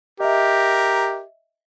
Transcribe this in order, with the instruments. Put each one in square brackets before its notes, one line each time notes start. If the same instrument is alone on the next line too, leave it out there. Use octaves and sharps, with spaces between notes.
[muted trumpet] G4 [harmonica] A#4 [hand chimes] D#5 E5